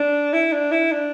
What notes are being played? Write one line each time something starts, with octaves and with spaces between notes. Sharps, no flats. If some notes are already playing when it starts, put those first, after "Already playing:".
Already playing: D4
E4
D4
E4
D4